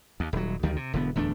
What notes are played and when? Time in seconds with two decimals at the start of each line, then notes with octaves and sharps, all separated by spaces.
0.20 D#2
0.33 D#1 F#3
0.63 D2 D#3 G3
0.76 C3
0.93 E1 D3 B3
1.15 D1 E2 A3 D4